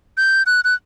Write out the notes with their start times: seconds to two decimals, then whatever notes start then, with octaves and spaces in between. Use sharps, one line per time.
0.17 G6
0.46 F#6
0.65 F#6